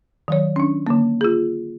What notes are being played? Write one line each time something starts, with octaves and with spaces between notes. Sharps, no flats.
D#3 F#3 C#5
C#4 D4
D3 A#3
F4 G#4